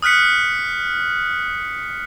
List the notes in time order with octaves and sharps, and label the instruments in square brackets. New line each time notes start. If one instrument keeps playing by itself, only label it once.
[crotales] D#6 F6 F#6 B6 C#7